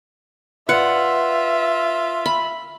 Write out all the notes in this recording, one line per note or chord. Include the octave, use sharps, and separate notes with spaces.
F4 B4 D5 E5 F#5
B5